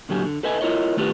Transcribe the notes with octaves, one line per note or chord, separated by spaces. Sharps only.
A#2 D3 F#3 G4 G#5
D3
A4 B4 D#5 E5 G#5
E4 F4 A#4 C#5 D#5
D#3 A3 D4 F4 G4 B4